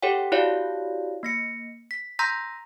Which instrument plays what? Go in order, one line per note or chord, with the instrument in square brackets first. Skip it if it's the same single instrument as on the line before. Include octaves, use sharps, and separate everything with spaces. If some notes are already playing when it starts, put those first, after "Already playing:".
[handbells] G4 A4 C#5 F#5 G5
E4 F#4 G4 C#5 D5 F5
A#3 A#6 C#7
B6
A#5 C6 E6 G6 A#6 B6